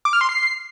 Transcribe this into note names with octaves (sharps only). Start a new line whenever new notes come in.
D6
F6
C6
C7